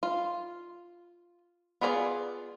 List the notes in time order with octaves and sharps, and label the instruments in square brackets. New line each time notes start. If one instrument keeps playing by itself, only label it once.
[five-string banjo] F4
B3 F4 G#4 A#4 D5